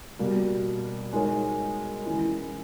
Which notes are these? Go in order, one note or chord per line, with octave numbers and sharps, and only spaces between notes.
B2 G3 A#3
G#3 D#4 A#4 C#5
E3 G#3 C#4 E4